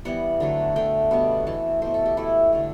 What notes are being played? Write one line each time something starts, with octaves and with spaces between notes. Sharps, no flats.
E3 G3 B3 F#5
D3 F#3 A3
D3 A3 G5
B2 G3 B3
E3 A3 A5
B2 A3 C5
A4
G4
B2 A3 E4
D3 A3